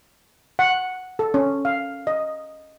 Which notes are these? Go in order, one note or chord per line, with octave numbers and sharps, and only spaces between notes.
F#5
A4
C#4
F5
D#5